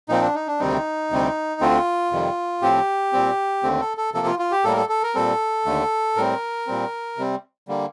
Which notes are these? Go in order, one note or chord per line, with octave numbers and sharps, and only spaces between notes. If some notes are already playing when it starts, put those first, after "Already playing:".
A#2 F3 C4 D#4
D4
D#4
D4
D2 C3 D#3 G3 C4 D#4
D2 C3 G3 C4
D2 D3 A3 C4 F4
F2 C3 D#3 G3
A2 F3 C4 G4
A#2 G3 C4
D#2 D3 A3 C4
A4
A4
C3 F3 A#3 A4
F4
F4
G4
A2 G3 A#3 A4
A#4
A4
A4
A#4
A#2 G3 C4 A4
D#2 D3 A3
A2 G3 C4 A#4
A#2 G3 C4
C3 G3 C4
D3 G3 A#3